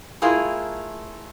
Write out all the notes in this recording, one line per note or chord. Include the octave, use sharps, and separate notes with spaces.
A3 E4 F4 G#4 A#4